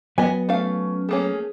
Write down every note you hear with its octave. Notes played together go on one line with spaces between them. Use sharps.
F#3 B3 D#5 G#5
A3 C#4 F5
A3 A#3 C#4 G#4